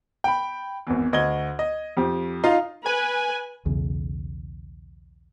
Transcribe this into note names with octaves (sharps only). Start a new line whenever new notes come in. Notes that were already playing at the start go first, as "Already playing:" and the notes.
G5 B5
G#1 E2
D2 D#5 G#6 G7
D#5
F2 G4
D#4 F4 F5
B4 G#5
B1 E2 C#3